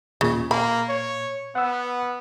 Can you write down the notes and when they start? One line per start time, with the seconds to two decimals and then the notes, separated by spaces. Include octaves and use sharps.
0.21 D#2 A#2 C#3
0.51 A#2 A#3 B5
0.89 C#5
1.55 B3 F#5 E6